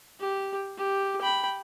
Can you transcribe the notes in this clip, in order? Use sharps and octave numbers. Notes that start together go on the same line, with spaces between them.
G4
G4
G5 B5